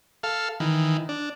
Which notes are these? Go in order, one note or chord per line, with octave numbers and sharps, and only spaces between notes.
A4 F5
D#3 E3
D4